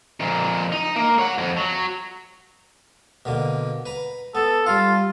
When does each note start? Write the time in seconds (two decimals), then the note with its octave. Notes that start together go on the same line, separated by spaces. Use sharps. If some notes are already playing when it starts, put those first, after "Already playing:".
0.21 F2 A#2
0.72 D#4
0.96 A#3
1.19 C#5 F#5
1.38 F2
1.57 F#3
3.25 B2 D3 A#3
3.86 B4 A#5
4.35 B3 A4
4.67 G3 F4 F5